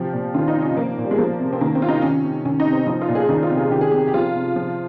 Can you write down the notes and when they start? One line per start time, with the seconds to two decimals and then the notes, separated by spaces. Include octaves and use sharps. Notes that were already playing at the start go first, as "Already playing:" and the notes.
Already playing: C3 F3 G4
0.13 A#2
0.34 D#3 F4
0.48 D#4
0.56 C3
0.62 C#4
0.76 F3 A#3
0.98 A#2
1.04 G3
1.11 G#3
1.18 F3 A#3
1.40 C3
1.53 C4
1.61 D#3 A#3
1.75 C4
1.81 C3 F4
1.88 D#4
2.02 D#3 C#4
2.24 C3
2.45 D#3 C#4
2.60 D#4
2.66 C3
2.72 C4
2.87 F3 D#4
3.01 F4
3.08 A#2
3.15 G#4
3.29 D#3 D#4
3.43 F4
3.51 C3
3.57 G#4
3.71 D#3 G4
3.81 G#4
3.91 C3 G4
4.08 G4
4.14 F3 F4
4.35 C3
4.56 F3